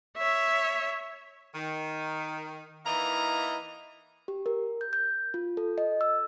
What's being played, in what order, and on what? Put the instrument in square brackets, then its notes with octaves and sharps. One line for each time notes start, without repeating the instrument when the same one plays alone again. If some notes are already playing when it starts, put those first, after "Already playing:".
[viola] C#5 E5
[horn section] D#3
E3 A#3 D#4 E4 D#5 A#5
[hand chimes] G4
A#4
G6
G6
F4
A4
D#5
E6